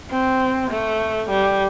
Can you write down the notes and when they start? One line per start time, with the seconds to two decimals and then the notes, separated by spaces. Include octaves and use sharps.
0.10 C4
0.71 A3
1.30 G3